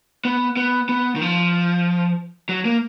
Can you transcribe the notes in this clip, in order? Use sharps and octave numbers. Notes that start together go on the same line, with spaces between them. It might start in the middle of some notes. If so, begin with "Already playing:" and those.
B3
B3
B3
D#3
F3
F#3
A#3